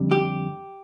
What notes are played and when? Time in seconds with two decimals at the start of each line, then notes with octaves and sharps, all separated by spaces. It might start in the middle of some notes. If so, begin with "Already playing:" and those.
Already playing: F2 D3 G3
0.11 G4